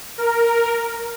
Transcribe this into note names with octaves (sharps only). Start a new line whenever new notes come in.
A#4